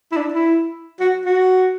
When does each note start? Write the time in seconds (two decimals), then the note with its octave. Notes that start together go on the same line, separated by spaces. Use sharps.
0.12 E4
0.17 D4
0.34 E4
1.00 F#4
1.25 F#4